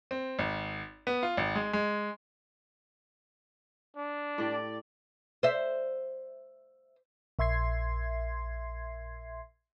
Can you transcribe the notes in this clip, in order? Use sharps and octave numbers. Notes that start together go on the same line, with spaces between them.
C4
G#1
B3
F4
G#1
G#3
G#3
D4
A2 G4 D5
C5 E5
A#1 E5 C6 G#6 C7